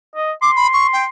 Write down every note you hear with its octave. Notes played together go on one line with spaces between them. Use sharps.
D#5
C6 D6
B5
C#6
G5